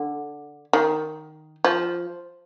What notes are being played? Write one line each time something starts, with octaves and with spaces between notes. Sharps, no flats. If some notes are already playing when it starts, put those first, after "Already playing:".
Already playing: D3
D#3
F3